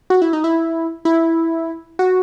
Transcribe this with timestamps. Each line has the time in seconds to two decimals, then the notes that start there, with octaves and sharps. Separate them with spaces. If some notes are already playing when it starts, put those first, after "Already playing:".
0.10 F#4
0.22 E4
0.33 D#4
0.44 E4
1.05 E4
1.99 F#4